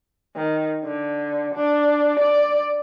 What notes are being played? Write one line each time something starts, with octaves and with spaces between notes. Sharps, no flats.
D#3
D3
D4
D5